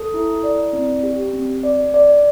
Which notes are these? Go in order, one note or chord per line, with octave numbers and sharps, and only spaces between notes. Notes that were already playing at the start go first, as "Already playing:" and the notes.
Already playing: A4
E4
D5
C4
G4
C4
D5
D5